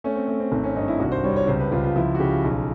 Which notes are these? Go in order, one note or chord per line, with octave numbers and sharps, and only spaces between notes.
A3 C#4
C4
A3 C4
C4
G#1 C4
C#4
G2 D#4
E4
C2 F#4
C5
G3 C#5
C#5
C#2 C5
B4
C#2 F4
F4
F3 E4
F#4
C#3 G4
B1